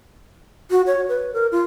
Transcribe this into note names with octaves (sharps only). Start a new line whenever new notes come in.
F#4
C#5
B4
A#4
F4